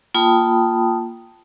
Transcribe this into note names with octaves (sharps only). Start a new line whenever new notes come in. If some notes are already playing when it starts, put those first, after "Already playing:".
A#3 F4 G5 A5 B5 D#6